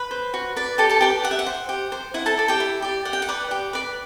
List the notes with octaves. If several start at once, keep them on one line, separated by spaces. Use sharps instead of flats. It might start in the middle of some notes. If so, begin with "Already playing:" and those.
Already playing: B4 B5
C5
F#4
B4 D5
G4 A4 A5
A4 A5
G4 B4 D5 G5
G4 F#5
E5
F#5
C5
G4
C5
E4 F#5
A4 A5
A4 D5
G4 G5
E4
G4 D5
G4 F#5
G5
F#5
B4 D5
G4
B4 D5